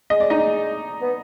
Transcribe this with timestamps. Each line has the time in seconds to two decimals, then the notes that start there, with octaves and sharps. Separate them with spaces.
0.10 G#3 D#5
0.20 D5
0.30 D#4 D#5
1.01 B3